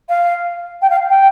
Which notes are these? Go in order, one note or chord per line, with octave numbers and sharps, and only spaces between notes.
F5
G5
F5
G5